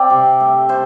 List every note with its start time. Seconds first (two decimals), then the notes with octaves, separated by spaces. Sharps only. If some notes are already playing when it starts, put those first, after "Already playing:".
Already playing: C4 D5
0.10 C3
0.40 A3
0.69 A3 C5